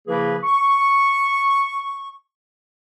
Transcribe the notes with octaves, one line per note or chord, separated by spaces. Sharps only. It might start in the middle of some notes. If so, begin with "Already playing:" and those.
C#3 F3 A#3 E4 G#4 B4
C#6